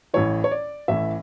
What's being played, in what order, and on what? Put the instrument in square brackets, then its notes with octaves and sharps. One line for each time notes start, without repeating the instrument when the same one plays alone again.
[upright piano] A1 A2 E3 C#5
C#5
D5
A1 A2 E3 E5